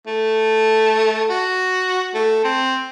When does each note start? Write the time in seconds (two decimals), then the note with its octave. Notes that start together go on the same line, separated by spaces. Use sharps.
0.07 A3
1.30 F#4
2.14 A3
2.45 C4